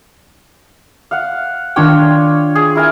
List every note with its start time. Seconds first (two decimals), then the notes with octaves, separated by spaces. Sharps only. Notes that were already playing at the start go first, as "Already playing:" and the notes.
1.11 F5 F#5
1.76 D#3 D4 F4 C#5 D5 G5
2.55 G#4
2.75 E4 A#4 G#5